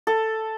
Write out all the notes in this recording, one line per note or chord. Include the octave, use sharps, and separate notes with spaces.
A4